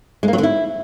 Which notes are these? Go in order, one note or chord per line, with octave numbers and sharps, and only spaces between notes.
G#3
A#3
F#3
D3
E4